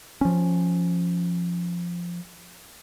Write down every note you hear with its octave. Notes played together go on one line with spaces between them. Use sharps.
F3 C#4